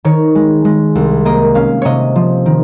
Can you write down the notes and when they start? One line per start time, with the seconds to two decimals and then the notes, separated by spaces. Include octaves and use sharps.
0.05 D#3 C#5
0.35 G#3
0.65 G#3
0.95 C2
1.25 A#3 D#5
1.55 C#4 F5
1.82 C3 C#5 D#5
2.16 F3
2.46 D#3